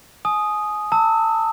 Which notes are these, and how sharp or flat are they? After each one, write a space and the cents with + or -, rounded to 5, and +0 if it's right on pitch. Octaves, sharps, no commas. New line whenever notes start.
G#5 +30 D#6 +0
A5 +35 E6 -20